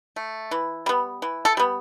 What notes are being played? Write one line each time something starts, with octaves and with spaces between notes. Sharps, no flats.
A3
E3
G3 B3
E3
A4
G3 B3